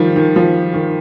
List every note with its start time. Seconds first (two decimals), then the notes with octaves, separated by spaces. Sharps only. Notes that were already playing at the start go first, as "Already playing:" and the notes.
Already playing: D#3 F3 G3
0.16 D#3
0.36 F3
0.74 D#3